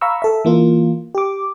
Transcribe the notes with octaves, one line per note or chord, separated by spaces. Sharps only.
F5 A#5 B5 C#6 E6
A4 E5
E3 A#3 F4
G4 D6